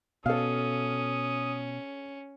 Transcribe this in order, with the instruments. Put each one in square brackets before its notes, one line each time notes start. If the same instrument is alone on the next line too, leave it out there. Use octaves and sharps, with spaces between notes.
[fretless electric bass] B2 [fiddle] C#4 [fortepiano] A4 F5 [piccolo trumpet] D#6